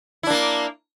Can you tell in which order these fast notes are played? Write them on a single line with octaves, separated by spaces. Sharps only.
E4 D4 A#3